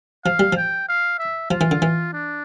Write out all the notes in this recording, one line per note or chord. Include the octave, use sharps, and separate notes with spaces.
F3 F5
G3
F3 G5
F5
E5
F3 F4
E3
D3
E3
D4